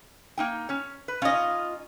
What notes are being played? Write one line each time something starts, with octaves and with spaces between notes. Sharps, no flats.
A#3 D#4 G5
C#4 C#5
B4
C#4 D#4 F4 D#5